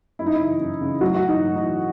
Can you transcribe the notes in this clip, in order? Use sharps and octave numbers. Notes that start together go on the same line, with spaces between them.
F#2 E4
D#4
E4
C#3 E3
F#2
C#3 E3
A2 F#3 F#4
F#3 F#4
E3
D#4
A2
D#4
E3